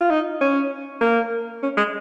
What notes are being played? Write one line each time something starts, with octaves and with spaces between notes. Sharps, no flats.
F4
D#4
C#4
A#3
C#4
G#3